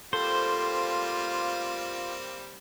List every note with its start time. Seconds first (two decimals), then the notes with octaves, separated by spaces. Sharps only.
0.13 G3 A3 A#3 C4 F4 C5